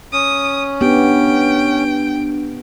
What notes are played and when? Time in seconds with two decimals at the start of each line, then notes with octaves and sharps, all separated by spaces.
0.13 C#4 D#6
0.81 B3 D4 G4 G5